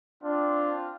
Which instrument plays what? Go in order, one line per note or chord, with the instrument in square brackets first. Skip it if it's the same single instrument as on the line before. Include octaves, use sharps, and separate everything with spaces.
[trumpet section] C4 F4 [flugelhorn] D4